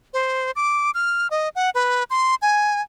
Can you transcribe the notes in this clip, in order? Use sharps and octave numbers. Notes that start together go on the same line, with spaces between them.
C5
D6
F6
D#5
F#5
B4
C6
G#5